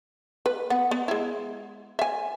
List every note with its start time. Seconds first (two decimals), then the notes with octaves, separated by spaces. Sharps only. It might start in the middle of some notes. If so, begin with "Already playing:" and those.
0.46 B4
0.70 B3 F#5
0.91 B3
1.08 G#3 E4
1.99 E5 G#5